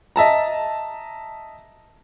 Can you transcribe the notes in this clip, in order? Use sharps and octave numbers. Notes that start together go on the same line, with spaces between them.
D#5 E5 A5 A#5